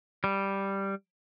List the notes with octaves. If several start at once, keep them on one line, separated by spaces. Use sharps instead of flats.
G3